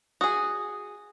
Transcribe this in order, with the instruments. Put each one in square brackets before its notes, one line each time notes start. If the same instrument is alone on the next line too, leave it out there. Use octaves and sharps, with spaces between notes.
[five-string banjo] F#4 G#4 [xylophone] D#6